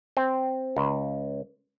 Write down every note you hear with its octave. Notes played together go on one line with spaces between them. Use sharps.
C4
C#2